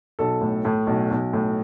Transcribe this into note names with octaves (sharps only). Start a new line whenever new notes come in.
B1 A4
A2
A2
B1
B1
A2